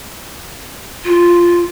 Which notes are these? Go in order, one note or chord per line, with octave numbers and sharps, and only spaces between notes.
F4